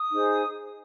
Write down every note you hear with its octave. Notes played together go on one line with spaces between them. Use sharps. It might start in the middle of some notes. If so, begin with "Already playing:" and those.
Already playing: D#6
D#4 G#4 C5